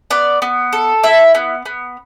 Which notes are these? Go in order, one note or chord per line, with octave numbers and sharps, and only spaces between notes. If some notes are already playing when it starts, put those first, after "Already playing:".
B3 D5
B3
A4
E4 E5
B3
B3